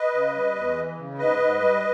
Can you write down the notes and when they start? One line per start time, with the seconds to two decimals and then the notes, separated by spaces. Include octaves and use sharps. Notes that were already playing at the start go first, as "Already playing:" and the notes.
Already playing: B4 D#5
0.14 C#3
0.35 G3
0.56 E2
0.77 E3
0.97 C#3
1.18 G#2 B4 D#5
1.39 G#2
1.60 G3